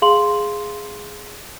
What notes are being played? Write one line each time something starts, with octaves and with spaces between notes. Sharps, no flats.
G#4 F5 C6 F#7